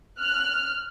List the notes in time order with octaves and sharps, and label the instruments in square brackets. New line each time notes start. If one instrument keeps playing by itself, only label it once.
[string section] F6 F#6